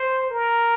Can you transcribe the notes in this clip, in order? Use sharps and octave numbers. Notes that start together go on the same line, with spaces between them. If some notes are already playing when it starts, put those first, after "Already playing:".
Already playing: C5
A#4